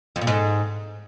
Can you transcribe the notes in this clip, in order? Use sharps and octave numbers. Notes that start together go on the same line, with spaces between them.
F2
A#2
G#2